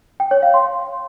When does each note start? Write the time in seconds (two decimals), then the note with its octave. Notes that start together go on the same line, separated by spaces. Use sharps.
0.20 G5
0.31 C#5
0.42 F5
0.54 C6